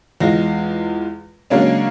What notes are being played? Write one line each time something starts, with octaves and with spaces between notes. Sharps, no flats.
E2 G#3 F4 A#6
C#3 F#3 G#3 A#3 C#4 D4